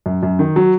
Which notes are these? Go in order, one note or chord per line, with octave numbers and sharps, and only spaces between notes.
F#2
F#2
D#3
F#3